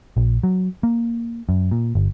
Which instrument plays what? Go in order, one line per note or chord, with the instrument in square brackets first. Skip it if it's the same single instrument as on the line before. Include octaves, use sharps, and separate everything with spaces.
[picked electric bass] A#1
F#3
A#3
F#2
A#2
G1